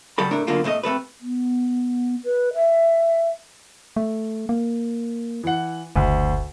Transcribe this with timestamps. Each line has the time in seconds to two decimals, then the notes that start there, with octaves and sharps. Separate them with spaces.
0.18 C#3 F#3 G3 A4 B5
0.31 A2 A3 D4 A#4
0.47 F#2 B2 D3 A#3 D4 F4
0.64 A#2 A3 C5 D#5
0.83 C3 A3 A4 B4
1.21 B3
2.24 B4
2.54 E5
3.96 A3
4.49 A#3
5.43 E3 F#5
5.96 F#1 D2